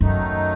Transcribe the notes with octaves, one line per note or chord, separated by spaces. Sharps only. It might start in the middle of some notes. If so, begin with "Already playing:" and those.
F#2 D#3 F#3 A3 D#4